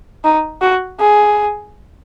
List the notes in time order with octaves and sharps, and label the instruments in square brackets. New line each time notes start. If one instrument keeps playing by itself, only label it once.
[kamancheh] D#4
F#4
G#4